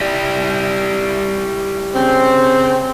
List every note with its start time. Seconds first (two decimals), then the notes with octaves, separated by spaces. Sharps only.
0.01 E4 G4 D5
1.95 C#3 C4